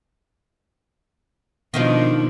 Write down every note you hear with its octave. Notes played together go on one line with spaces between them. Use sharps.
B2 D#3 F3 D4 D#4 F4